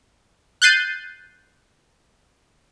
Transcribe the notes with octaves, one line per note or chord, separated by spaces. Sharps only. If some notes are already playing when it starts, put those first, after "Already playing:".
F#6 G6 A6 C7 D#7